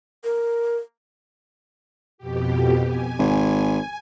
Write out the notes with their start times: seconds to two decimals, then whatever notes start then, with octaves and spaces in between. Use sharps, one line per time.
0.24 A#4
2.18 F2 B2 G4
2.85 G#5
3.19 G#1